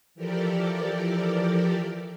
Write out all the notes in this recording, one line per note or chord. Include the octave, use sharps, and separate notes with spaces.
E3 F3 G4 A4 A#4 D5